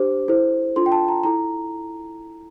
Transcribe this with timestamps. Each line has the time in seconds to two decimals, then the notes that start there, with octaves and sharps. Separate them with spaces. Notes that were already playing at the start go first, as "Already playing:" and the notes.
Already playing: D4 G4 C5 D6
0.28 E4 A4 C5
0.76 D4 F4 A4 C6
0.86 G5
0.92 A5
1.08 A#5
1.24 E4 A4 A#5